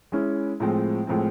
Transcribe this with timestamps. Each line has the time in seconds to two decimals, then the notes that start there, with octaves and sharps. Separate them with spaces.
0.12 G#3 C#4 E4
0.60 A2 F3 G#3 C4
1.07 A2 F3 G#3 C4